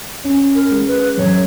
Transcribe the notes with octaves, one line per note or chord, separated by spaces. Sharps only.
C#4
A#4
G#3
B4
F#2 C#5